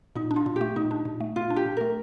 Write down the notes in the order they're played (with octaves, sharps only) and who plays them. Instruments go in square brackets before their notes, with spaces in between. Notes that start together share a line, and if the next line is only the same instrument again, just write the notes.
[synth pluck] A#2 [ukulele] D#4
[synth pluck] D4
[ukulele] F4
[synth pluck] A#2
[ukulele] G4
[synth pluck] A3
[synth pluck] A#2 [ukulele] D#4
[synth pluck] D4
A#2
A3
[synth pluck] A#2 [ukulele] F4
[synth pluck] D4
[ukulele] G4
[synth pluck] A#2
[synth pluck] A3 [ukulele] A#4